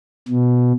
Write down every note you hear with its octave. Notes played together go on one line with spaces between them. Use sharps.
B2